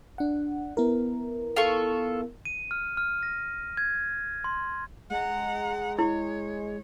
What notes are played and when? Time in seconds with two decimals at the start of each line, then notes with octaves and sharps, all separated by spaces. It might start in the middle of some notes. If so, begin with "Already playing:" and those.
0.18 D4 F#5
0.77 B3 E4 A#4
1.56 F4 A4 C#6
2.45 D#7
2.71 F6
2.97 F6
3.23 A#6
3.77 G#6
4.44 C6
5.10 G#3 F#5 A#5
5.99 E4 C#5